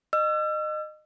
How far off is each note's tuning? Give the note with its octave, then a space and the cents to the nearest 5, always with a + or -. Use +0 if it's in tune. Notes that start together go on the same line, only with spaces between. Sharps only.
D#5 -25 E6 +40